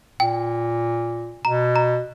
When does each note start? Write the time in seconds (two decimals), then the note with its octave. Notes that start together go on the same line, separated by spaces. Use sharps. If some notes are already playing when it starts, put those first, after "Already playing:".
0.20 A#2 G5
1.45 B2 A#5
1.76 A#5